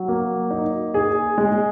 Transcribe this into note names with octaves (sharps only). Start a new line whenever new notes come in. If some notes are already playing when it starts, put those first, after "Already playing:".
Already playing: F#3
A#3
D#4
G#4
G#3